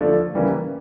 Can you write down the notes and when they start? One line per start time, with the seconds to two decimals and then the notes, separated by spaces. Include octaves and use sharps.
0.01 D3 F3 A3 D4
0.34 C#3 E3 G3 A#3 C#4